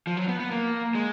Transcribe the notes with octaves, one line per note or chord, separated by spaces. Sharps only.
F3
F#3
B3
B3
A#3
G#3